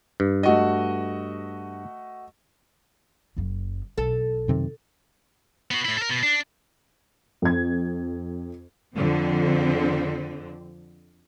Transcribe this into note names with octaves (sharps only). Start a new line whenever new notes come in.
G2
A3 F#4 D#5
F#1 F#2
B1 A4
F#2 C3 D#3
B3 F#4
A2 E4
A4 A#4
B2
D4
F2 G#6
F2 D3 C4